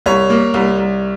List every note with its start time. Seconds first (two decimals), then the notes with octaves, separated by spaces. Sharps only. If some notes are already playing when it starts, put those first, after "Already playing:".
0.06 C2 C#5
0.30 A#3
0.54 C2
0.78 C2